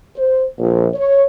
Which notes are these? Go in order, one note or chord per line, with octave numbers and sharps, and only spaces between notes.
C5
A#1
C#5